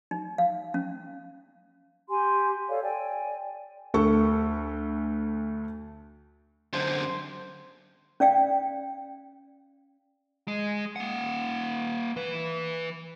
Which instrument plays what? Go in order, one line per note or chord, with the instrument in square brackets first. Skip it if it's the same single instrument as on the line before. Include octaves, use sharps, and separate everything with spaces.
[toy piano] D#4
F5
C#4
[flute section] G4 G#5 C6
A4 C#5 D5 F5
D5 G5 G#5
[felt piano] D2 A4 C#6
[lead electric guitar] F#2 D3 [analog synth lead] C5
[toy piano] C#4 D5 F5 G5
[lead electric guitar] G#3
A#3 F#5
E3 B4